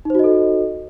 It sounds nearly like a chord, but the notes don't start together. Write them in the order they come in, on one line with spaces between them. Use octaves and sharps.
D#4 C5 F#4 D#5 A4